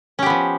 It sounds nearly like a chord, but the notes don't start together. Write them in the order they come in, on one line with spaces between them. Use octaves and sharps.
C#4 G4 B3 F3